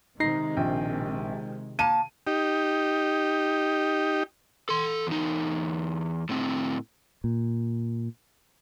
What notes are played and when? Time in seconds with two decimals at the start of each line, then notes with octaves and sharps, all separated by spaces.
0.20 C3 D#3 G#3 D#4 A#6 C7
0.57 A#1 G5
1.79 A#3 A5 D#7
2.27 D#4 G4
4.69 A4 C6
5.07 E2 D#4
6.29 A2 C4
7.24 A#2